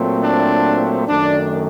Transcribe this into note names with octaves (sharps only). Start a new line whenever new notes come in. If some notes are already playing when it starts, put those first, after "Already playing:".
Already playing: A#2 F#3 A3 C4
D4
F#2 D#3 A3 D4